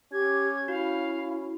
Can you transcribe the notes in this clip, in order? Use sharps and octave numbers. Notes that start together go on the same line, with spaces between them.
C#4 G4 G#6
E4 F#4 F5